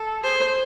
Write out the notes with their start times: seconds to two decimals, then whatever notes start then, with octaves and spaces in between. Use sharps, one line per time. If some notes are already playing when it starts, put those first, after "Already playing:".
Already playing: A4
0.23 G#4 C5